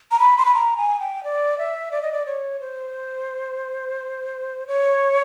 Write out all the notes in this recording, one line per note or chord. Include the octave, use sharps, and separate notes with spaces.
A#5
B5
C6
B5
A#5
G#5
G5
D5
E5
D5
D#5
D5
C#5
C5
C#5